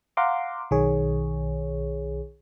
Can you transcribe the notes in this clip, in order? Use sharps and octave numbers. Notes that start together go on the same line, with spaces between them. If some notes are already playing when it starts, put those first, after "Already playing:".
F5 F#5 A#5 C6 D6
B1 D#3 G#4 C#5